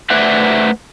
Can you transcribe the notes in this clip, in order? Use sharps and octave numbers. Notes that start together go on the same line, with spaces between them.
A3 B4 C5 D5 E5 F#5